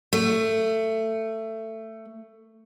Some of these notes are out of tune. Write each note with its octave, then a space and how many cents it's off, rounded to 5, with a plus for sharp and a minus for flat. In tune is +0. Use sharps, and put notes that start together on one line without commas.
A3 +15